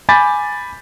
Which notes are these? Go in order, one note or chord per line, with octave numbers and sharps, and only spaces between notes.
G#5 B5 D6 G6 A6 B6